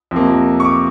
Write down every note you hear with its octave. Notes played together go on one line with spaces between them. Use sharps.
F2 C3 F3 A#3
C#6
D6